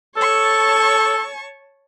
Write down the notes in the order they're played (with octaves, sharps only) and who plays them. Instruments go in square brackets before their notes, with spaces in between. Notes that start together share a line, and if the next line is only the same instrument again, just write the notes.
[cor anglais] A4 [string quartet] C#5 A5 C#6